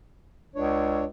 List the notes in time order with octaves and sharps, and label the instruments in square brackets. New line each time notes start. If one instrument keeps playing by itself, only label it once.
[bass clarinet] C#2 [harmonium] D4 C#5